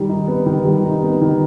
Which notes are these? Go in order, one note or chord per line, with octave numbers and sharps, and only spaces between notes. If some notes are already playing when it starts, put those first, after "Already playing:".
Already playing: D#3 G3
D#4
B3
D#3
G3
D#4
B3
D#3